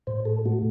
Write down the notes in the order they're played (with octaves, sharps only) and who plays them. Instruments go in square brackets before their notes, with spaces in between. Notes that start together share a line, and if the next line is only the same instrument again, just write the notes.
[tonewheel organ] A2 C5
A4
A3 F#4